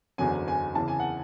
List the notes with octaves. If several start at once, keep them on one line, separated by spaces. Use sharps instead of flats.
F#1 E2 D3 F#3 G#5
G#5
E2 C#3 E3 A5
G#5
F#5